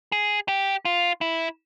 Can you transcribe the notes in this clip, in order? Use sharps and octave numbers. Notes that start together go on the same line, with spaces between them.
G#4
G4
F4
E4